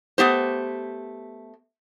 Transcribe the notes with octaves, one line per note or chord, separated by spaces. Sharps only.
A3 B3 G4 C5